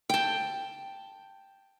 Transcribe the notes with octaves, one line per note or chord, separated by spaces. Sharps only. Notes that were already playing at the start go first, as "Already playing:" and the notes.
G5 A5